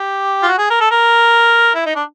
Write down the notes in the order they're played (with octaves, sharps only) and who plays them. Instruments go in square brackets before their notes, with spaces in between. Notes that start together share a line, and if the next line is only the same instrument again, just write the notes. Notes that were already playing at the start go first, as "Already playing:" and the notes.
Already playing: [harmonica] G4
F4
F#4
G#4
A#4
A4
A#4
E4
D#4
D4